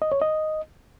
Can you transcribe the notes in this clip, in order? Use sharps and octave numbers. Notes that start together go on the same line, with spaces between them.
D#5
C#5
D#5